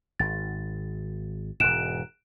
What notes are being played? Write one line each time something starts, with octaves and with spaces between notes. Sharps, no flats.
G#1 A6
E1 G#2 F#6 D7 E7